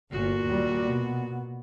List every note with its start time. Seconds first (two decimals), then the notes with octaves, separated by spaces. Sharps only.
0.12 G1 A#2 F#4
0.45 D#2 G3
0.86 B2 B3